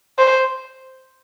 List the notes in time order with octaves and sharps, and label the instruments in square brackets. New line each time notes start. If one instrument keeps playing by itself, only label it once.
[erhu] C5